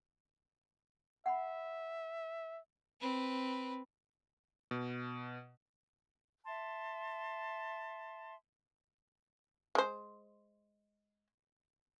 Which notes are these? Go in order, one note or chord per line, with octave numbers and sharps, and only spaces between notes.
E5 F#5 B5
C4 B4
B2
E5 A5 C6
G#3 C5